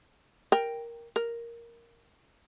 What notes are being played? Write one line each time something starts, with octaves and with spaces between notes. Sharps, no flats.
A#4 G5
A#4